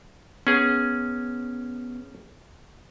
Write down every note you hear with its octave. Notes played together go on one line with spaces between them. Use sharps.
B3 C#4 G#4